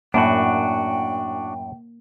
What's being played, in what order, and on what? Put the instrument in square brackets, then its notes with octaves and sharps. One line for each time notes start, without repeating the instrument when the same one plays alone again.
[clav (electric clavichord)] F#2 A2 [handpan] A#3 [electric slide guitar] D4 F#4 [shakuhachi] G5